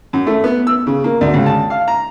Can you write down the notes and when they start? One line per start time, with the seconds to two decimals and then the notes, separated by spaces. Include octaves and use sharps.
0.13 F#2
0.27 A3
0.44 B3
0.67 E6
0.87 C#3
1.04 A#3
1.21 D2
1.34 C#2
1.46 A5
1.70 F5
1.88 A#5